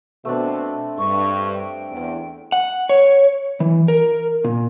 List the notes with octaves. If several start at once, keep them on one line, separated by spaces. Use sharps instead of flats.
B2 A3 C4 D4
G2 C#6
G5
E2
F#5
C#5
E3
A#4
A#2